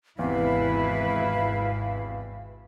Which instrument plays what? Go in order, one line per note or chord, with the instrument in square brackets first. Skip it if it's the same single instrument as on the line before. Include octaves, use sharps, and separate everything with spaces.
[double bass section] G#1 [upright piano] E2 C3 [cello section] E3 E4 B4 [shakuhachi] F5